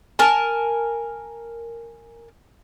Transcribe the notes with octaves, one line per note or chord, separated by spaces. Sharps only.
A#4 G#5 A5